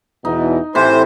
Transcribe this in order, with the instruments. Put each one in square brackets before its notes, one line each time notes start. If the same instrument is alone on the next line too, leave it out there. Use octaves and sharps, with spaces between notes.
[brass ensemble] E2 B2 E3 [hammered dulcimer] D#4
[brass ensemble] A2 [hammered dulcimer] C3 E3 [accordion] C5